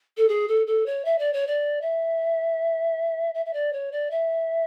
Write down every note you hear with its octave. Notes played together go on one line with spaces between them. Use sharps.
A4
G#4
A4
A4
C#5
E5
D5
C#5
D5
E5
E5
E5
D5
C#5
D5
E5